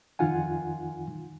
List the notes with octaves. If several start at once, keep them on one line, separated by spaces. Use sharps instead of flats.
F2 D#3 D#4 F4 F#5 G#5